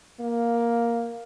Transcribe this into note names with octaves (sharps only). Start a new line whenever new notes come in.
A#3